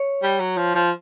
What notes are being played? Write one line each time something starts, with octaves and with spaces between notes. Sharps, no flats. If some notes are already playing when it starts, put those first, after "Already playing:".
Already playing: C#5
G3
F#3
F3
F3